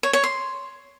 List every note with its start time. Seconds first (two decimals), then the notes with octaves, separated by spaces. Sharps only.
0.03 C#5
0.13 C#5
0.24 C6